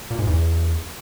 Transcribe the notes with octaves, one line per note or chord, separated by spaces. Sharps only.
A#2
G#2
E2